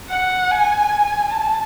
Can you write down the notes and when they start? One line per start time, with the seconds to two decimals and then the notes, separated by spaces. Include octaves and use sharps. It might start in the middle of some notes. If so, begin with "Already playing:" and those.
0.09 F#5
0.51 G#5
1.34 A5